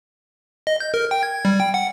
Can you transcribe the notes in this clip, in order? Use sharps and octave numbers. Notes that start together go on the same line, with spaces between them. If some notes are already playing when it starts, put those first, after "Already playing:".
D#5
G6
A#4
G5
G#6
G3
G5
F#5